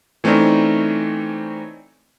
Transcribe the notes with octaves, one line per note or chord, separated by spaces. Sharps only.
E3 A3 C4 C#4 D#4 D5